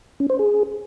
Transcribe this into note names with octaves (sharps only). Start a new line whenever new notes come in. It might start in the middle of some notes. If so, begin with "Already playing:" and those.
C#4
C5
G#4